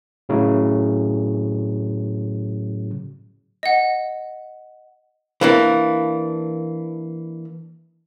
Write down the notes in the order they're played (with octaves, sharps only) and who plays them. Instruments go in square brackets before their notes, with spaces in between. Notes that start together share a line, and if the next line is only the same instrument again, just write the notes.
[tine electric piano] A2 C#3 F#3
[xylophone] D#5 F#5
[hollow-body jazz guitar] E3 A#3 D4